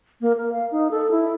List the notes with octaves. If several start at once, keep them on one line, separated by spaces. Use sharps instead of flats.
A#3
A#4
F5
D#4
A4
E4